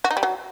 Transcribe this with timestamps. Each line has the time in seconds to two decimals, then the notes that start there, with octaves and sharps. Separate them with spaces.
0.04 F#4
0.11 D#4
0.17 G3
0.23 F#3